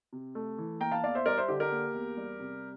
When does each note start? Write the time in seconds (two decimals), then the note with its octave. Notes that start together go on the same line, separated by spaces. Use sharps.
0.13 C3
0.35 A3
0.58 E3
0.80 A#3 G5 A#5
0.92 F5 A5
1.03 E2 D5 F5
1.15 C5 E5
1.26 G3 A#4 D5
1.38 C5 E5
1.48 D3 G4
1.60 G4 A#4
1.72 A#3
1.94 E2
2.17 G3
2.40 C3